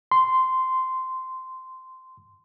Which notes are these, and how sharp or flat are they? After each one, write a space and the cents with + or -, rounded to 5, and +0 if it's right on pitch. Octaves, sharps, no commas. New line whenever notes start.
C6 -10